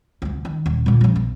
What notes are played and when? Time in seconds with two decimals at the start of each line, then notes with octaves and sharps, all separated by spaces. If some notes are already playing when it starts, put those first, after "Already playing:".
0.22 D2 C3
0.45 D#3
0.66 D#1
0.86 A#2 D3
1.01 F2 C#3
1.16 B1